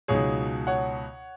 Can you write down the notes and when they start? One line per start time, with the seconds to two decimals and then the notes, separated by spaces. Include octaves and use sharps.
0.08 C#2 B2 F#3 D#4 G#4 C#5
0.67 C#5 F#5